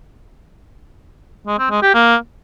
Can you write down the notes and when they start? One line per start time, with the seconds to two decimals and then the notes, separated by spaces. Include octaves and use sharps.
1.47 G#3
1.59 C4
1.70 G#3
1.82 G4
1.94 A#3